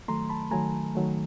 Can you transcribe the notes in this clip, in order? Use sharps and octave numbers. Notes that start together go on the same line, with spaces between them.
D#3 F#3 A3 A#5 C6
A5 B5
D#3 F#3 A3 G#5 A#5
D#3 F#3 A3